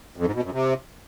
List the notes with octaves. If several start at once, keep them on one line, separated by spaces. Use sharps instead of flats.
F2
G#2
B2
F#2
C3